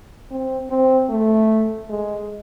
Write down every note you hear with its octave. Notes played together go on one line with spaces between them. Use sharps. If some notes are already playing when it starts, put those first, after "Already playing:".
C4
C4
A3
G#3